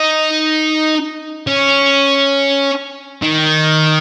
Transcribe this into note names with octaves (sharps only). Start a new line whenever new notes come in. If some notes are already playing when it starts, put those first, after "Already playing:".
Already playing: D#4
C#4
D#3